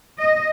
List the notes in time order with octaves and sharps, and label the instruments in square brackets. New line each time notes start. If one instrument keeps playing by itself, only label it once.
[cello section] D#5